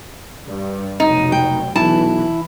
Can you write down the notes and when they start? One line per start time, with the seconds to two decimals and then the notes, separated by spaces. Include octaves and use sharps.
0.47 G2
1.00 F1 B2 F#3 D#4
1.32 G5
1.76 B1 E3 E4 A5